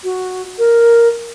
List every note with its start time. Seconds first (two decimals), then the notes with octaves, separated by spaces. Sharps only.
0.04 F#4
0.59 A#4